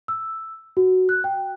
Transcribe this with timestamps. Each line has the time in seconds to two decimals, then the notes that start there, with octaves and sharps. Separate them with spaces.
0.08 E6
0.77 F#4
1.09 F#6
1.24 G5